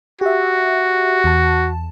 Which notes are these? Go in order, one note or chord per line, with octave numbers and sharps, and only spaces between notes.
F#4 G4 E5
E2 A5